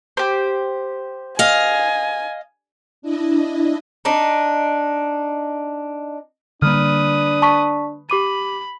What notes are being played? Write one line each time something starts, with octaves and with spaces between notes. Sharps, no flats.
G4 C5
D#5 F5 G#5
D4 E4 D#5
D4 D#4
D3 G3 A#3 D4 B4 D#6 F6
A5 C#6 B6
G4 B5 D6 D#7